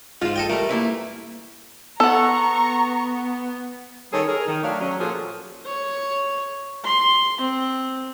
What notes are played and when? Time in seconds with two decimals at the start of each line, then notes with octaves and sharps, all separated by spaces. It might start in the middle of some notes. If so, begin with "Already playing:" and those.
0.22 G#2 F4 F5
0.36 A4 D#5 G5
0.49 G3 A3 A#4
0.69 A#3 E4 B4
2.00 B3 A4 F#5 A#5 C#6
4.13 D#3 G3 C#4 G#4 A4 C#5
4.28 G#4 A#4
4.46 D#3
4.63 F#3 A3 D4 C#5 F5
4.81 F#3 C#4
4.99 A#2 F3 F#3 A#3 G#4 A4
5.66 C#5
6.84 C6
7.41 C4